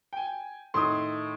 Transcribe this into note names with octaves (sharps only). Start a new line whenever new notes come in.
G5 G#5
A2 D#3 C6 D#6